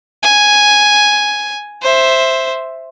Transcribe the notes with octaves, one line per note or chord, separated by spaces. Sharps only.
G#5
C5 E5